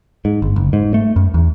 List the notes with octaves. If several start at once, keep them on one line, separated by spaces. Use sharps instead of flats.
G#2
G1
F#1
G#2
A3
F#2
E2